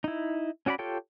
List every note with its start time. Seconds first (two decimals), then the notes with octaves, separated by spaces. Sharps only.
0.04 D#4 E4
0.66 C#4 F#4 D5 F#5 B5
0.79 F4 G4 A4 C#5 G5